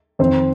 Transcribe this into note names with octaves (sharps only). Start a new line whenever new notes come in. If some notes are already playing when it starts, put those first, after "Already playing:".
F2 D#3 C4 C5